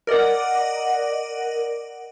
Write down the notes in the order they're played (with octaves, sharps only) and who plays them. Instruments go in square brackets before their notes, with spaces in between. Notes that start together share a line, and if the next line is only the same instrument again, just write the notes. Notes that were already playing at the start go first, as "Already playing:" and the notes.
[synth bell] A#4 D5 D#5 F#5